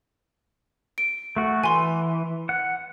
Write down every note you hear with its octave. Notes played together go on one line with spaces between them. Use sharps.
D7
A3 F#4
E3 G#5 C6
F#5